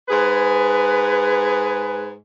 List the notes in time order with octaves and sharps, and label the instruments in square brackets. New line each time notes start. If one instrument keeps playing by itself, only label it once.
[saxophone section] G#2 G#4 B4